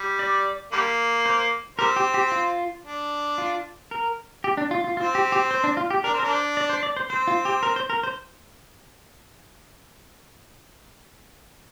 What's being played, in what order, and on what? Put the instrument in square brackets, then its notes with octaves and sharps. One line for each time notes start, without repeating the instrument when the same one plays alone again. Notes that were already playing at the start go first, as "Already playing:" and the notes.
Already playing: [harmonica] G3
[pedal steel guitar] D5
[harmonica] D3 G3 A#3
[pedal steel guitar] C5
[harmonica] G3 C4 [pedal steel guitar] A#4
[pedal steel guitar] G4
G4
F4
[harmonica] D4
[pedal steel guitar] F4
A#4
G4
D4
F4
F4
[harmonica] C4 [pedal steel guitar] F4
[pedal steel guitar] G4
G4
C5
D4
F4
G4
[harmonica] D4 [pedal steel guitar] A#4
[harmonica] C4
[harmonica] D4 [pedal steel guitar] A#4
[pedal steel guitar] C5
D5
C5
D5
C5
[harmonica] C4 [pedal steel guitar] C5
[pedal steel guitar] F4
G4
A#4
C5
A#4
C5